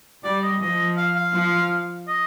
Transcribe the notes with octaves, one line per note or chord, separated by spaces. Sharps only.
G3 D5
D#5
F3 D#5
F5
F5
F3
D#5